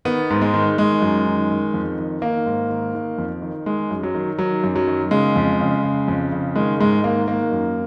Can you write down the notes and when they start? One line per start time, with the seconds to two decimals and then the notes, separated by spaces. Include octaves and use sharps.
0.05 D#3 B3
0.30 G#2
0.42 G#3
0.54 D#3
0.78 D#3 G#3
1.02 F#2
1.26 D#3
1.50 D#3
1.74 F2
1.98 D#3
2.22 D#3 A#3
2.46 G#2
2.70 D#3
2.95 D#3
3.18 F2
3.42 D#3
3.66 D#3 G#3
3.91 F#2
4.03 F#3
4.15 D#3
4.39 D#3 F#3
4.64 F#2
4.75 F#3
4.87 D#3
5.11 C#3 G#3
5.36 F2
5.60 C#3
5.83 C#3
6.08 F2
6.32 C#3
6.56 D#3 G#3
6.80 G#2 G#3
7.03 D#3 A#3
7.28 D#3 A#3
7.52 F#2